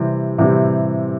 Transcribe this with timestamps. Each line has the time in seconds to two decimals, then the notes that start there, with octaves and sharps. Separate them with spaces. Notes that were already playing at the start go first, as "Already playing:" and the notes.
Already playing: C3 E3 G3 C4
0.38 C3 E3 G3 C4